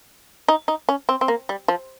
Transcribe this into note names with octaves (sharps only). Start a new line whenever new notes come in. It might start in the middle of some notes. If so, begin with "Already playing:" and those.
D#4
D#4
C#4
C4
C4
A#3
G3
F3